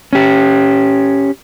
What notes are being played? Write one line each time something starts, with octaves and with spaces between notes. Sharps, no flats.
C#4 G4